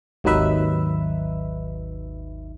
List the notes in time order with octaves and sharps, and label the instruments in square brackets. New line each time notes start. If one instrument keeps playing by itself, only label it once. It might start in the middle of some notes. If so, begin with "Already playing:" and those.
[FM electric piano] G#1 D#2 F#3 D#4 B4 E5